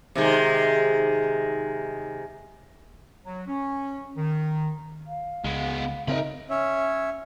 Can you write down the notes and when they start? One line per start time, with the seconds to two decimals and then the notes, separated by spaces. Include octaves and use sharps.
0.15 C3 D#3 G#3
3.25 F#3
3.47 C#4
4.17 D#3
5.07 F5
5.44 C#2 G#3 B3 G7
6.08 C#3 C4 D#4 A#4 E5 B5
6.50 C#4 C#5 E5